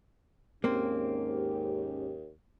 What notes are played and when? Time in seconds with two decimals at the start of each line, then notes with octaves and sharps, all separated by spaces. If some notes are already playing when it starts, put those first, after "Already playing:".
0.64 D#2 G#2 A#3 C4 C#4 G4